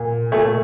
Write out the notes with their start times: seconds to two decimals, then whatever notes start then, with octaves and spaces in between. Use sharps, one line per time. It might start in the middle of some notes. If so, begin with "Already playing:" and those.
Already playing: A#2
0.32 A#2 A3